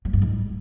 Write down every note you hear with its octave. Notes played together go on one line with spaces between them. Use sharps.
F#3
G2
G#2